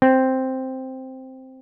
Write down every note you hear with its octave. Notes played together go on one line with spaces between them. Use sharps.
C4